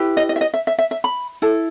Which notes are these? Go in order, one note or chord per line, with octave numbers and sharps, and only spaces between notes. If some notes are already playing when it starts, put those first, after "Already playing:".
Already playing: E4 G4 B4
D#5
D#5
E5
D#5
E5
E5
E5
E5
B5
E4 A4